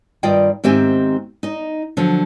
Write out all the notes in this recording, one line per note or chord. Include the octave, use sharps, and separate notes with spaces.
G2 D#3 F4 D5 D#5 G5
G#2 D#3 C4 G4 E5 G#5
D#4 D#5
D3 F3 F#3